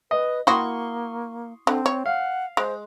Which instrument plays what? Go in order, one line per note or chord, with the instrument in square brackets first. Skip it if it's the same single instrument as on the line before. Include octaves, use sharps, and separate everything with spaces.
[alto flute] B4 [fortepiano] D#5
[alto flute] A#3 [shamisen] E4 F#4 [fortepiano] C6 C#6 D#6
[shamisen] D3 [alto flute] C4
[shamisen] C#5
[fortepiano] F5 [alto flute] F#5
[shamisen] G#3 [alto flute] C5